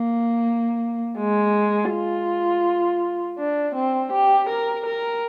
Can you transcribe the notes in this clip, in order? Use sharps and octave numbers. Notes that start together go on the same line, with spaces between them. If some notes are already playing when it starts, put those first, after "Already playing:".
Already playing: A#3
G#3
F4
D4
C4
G4
A#4
A#4